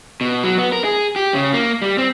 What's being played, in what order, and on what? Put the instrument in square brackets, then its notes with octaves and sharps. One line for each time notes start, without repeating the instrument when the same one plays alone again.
[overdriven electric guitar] B2
F#3
B3
A#4
G#4
G4
C#3
A#3
G3
C4